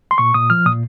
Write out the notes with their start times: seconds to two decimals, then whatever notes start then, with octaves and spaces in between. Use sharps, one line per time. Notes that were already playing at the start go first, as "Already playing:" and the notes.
0.11 C6
0.18 A#2 C#6
0.34 A#2 D#6
0.50 F3 F6
0.65 A#2 D#6